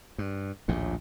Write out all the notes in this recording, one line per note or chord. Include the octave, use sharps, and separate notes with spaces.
G2
A#1 D#2 A2